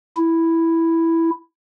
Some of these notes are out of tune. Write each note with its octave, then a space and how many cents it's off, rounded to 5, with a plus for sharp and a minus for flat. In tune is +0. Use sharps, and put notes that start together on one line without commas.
E4 +0